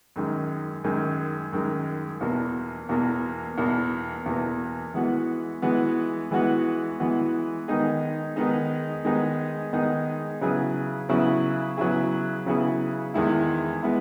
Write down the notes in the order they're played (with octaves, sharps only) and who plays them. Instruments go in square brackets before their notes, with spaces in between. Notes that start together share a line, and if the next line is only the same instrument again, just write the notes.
[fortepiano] F#2 D#3 G#3
F#2 D#3 G#3
F#2 D#3 G#3
E2 B2 A#3
E2 B2 A#3
E2 B2 A#3
E2 B2 A#3
E3 G#3 B3 F#4
E3 G#3 B3 F#4
E3 G#3 B3 F#4
E3 G#3 B3 F#4
D#3 G#3 B3 D#4 G#4
D#3 G#3 B3 D#4 G#4
D#3 G#3 B3 D#4 G#4
D#3 G#3 B3 D#4 G#4
C#3 F#3 B3 E4 G#4
C#3 F#3 B3 E4 G#4
C#3 F#3 B3 E4 G#4
C#3 F#3 B3 E4 G#4
E2 D#3 G#3 B3 E4
G#3 B3 E4